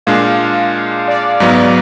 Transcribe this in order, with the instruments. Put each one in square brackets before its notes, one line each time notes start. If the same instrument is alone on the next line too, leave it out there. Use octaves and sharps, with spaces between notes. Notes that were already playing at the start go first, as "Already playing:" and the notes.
[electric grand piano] A#2 G#3 D4 [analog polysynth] F5
[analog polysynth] D5
[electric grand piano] G#2 F#3 B3